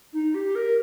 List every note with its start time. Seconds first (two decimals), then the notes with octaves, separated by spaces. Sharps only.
0.13 D#4
0.34 G4
0.55 A#4